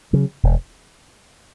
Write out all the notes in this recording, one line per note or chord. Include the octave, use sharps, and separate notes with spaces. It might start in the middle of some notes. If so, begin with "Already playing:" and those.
C#3 F#3
E1